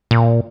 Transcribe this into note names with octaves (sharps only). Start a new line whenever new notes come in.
A#2